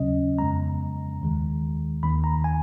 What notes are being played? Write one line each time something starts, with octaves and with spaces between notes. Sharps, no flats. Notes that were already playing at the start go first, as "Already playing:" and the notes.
Already playing: D#2 C#3 F#3 C#4 D#5
F2 C#3 G#3 B3 A#5
D#2 D#3 G#3
D#2 D#3 A#3 B5
A#5
G#5